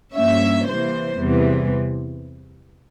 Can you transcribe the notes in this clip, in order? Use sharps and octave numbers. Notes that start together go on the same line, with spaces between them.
G2 F3 A#3 C#4 E5
C3 E3 G3 A#3 C5
E2 C3 E3 G3